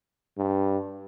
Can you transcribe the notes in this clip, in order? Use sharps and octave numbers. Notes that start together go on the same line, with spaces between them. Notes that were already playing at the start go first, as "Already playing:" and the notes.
G2